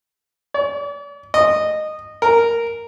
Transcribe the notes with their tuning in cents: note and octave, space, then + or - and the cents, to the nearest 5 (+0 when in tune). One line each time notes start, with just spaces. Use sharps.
D5 -45
D#5 -15
A#4 -5